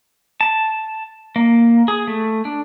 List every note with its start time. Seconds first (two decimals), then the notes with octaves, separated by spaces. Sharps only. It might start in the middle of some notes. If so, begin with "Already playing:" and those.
0.41 A5
1.36 A#3
1.88 G#4
2.07 A3
2.45 D4